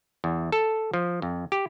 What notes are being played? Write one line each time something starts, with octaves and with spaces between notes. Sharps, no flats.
E2
A4
F3
F2
G4